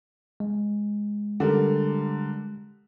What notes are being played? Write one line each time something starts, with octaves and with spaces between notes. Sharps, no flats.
G#3
D3 G3 A#4